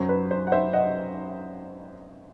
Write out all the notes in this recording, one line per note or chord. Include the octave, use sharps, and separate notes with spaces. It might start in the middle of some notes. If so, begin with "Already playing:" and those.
Already playing: F#2 F#3 C5
B4
C5
F#5
C5 E5
D#5 F#5